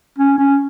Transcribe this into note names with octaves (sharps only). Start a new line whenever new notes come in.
C#4
C#4